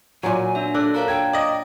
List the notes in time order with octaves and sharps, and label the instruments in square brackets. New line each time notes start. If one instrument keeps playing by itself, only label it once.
[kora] A#2 F#3 [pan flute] G#5
[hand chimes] D4 F#4 E5
[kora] D4 [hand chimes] A4 E6 F#6
[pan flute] A#4 [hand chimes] C#5 F5 A#5
[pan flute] G5 [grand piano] G#6
[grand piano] D5 D#5